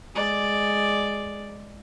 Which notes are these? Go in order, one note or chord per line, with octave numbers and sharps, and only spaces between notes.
G#3 D5